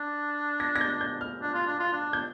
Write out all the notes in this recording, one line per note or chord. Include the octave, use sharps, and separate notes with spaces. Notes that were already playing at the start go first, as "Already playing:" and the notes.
Already playing: D4
A#6
A#6
G6
G6
F6
D4
F4
D4
F4
D4
G6